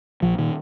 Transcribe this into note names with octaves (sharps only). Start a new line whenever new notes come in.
A#1 F3
A#2 D#3